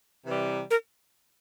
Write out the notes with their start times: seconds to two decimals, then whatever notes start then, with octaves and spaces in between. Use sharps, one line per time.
0.26 C3 E3 G3
0.71 A#4